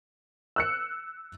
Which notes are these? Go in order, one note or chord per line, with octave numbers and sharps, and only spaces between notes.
E6 F#6 C#7